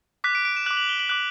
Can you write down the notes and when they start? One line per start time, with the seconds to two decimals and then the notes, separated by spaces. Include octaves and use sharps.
0.24 D6 F#6 B6
0.35 D7
0.45 D7
0.57 E7
0.66 D6 F#6 F#7
0.77 F#7
0.89 G7
0.99 F#7
1.09 D6 F#6 F#7